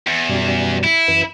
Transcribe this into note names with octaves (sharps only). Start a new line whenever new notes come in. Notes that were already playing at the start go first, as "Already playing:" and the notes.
E2
F#2 B2 G3
E4
F#2 E3